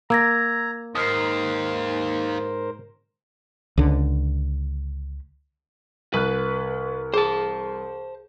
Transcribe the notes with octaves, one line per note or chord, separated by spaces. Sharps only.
A#3 A#5 E6 G#6 A#6
D#2 G#2 A#4 C5 D#6 F6 C7
C#2 D3
C2 B4 F#6
G#4 C5 A5